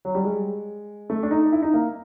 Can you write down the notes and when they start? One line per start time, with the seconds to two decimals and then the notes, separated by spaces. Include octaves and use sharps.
0.05 F#3
0.15 G3
0.24 G#3
1.10 A3
1.23 D4
1.31 D#4
1.52 E4
1.62 D#4
1.74 A#3